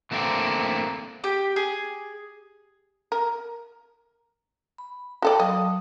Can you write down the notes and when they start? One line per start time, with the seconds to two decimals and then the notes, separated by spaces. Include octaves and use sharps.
0.11 E3 A3 A#3 C4 D4
1.24 G4
1.56 G#4
3.12 A#4
4.78 B5
5.22 F#4 A4 D5 F5 G5
5.39 F#3 D#5 F5 D#6